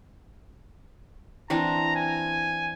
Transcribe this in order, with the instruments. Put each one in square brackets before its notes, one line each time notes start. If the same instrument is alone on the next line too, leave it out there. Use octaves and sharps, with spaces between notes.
[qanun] E3 C4 D4 [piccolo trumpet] A#5
[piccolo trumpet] G#5